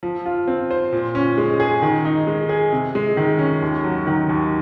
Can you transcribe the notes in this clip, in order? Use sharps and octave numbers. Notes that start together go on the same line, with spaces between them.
F3
F4
C4
C5
A#2
C#4
G#3
G#4
D#3
D#4
G#3
G#4
C3
G#3
D#3
C#4
D#2
F#3
D#3
D#2